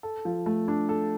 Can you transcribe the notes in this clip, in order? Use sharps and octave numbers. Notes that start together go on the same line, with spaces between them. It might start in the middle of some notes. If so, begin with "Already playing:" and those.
A4
F3
A3
D4
A4